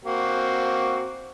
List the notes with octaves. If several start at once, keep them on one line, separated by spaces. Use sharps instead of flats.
A#3 C4 F#4